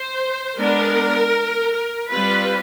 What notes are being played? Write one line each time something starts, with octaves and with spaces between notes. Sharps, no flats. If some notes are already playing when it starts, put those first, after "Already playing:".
Already playing: C5
G#3 B3 D4 A#4
A#4
G3 C4 F4 B4